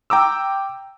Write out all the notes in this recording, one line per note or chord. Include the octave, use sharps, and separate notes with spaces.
G5 A#5 D6 E6